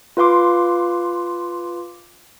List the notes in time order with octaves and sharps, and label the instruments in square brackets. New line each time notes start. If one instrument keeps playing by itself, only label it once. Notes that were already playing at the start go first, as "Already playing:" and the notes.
[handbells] F4 B4 F5 C6 D6